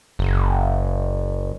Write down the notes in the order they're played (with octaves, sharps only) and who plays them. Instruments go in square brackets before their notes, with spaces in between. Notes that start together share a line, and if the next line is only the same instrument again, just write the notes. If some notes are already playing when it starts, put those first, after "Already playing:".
[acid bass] F#1